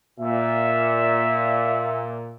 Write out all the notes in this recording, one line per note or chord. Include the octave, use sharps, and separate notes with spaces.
A#2 E5